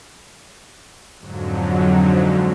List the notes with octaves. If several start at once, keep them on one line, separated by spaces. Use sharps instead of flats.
F2 G#2 D3 F#3